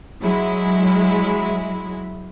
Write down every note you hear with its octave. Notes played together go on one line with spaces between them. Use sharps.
F#3 G#3 E4